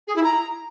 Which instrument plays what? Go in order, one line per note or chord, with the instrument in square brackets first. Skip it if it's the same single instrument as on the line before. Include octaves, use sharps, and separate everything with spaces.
[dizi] G#4
E4
A#5